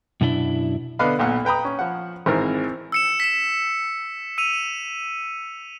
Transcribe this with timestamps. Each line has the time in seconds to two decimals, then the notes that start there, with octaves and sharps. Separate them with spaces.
0.21 F#2 B2 D4 E4
0.99 D3 B3 D4 D#5 F5 B5
1.19 B1 A#2 F#5
1.45 B4 G5 A#5 B5 D#6
1.65 C#4
1.79 F3 F#5
2.26 G#1 G#2 E3 C4 A#4 E5
2.92 E6 C#7 E7
3.20 B6 E7
4.38 E6 D#7 F7